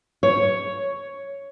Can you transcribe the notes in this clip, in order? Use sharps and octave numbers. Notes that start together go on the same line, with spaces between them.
C#5